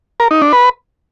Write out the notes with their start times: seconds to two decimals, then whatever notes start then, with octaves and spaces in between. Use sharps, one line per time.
0.20 A#4
0.31 D#4
0.42 D4
0.53 B4